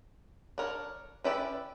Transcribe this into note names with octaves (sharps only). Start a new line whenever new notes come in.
D4 A#4 C#5
C#4 E4 G4 B4 D5